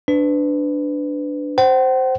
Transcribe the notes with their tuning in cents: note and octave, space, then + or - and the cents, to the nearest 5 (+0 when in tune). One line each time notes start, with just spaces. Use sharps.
D4 +0 B4 +25
C5 +0 F#5 +45